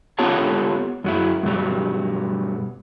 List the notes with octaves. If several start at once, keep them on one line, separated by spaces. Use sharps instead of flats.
B3 F4 G4 A4 C#5 A5
F#2 F#3 E4
G2 B2 F#3 G3